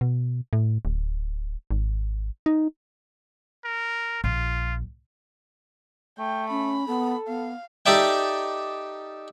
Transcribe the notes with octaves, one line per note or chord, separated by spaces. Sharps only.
B2
A2
D1
G#1
D#4
A#4
A#1 F4
A3 G5
C#4 B5
B3 A4
B3 F5
D#4 G4 A4 D5 E5 G5